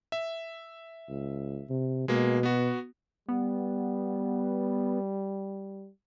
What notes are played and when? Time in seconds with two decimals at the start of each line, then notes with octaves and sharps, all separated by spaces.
0.12 E5
1.10 C#2
1.70 C3
2.08 B2 G#3 A#3
2.43 B3 F#4
3.29 G3 B3